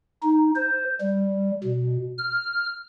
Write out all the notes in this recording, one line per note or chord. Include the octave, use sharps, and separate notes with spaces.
D#4
C5
G3
B2
F6